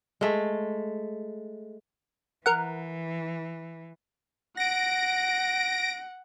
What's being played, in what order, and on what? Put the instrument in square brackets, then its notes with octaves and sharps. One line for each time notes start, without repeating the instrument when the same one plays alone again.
[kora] G#3 A3
[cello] E3 [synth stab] A#4 F#5
[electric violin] F#5 [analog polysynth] A#6 D7